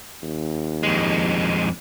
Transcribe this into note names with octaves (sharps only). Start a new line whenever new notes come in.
D#2
F2 G#3